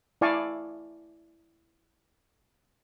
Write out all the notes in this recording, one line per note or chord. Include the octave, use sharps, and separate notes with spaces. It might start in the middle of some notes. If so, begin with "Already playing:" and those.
E4 D5 F5 G#5 A5 C#6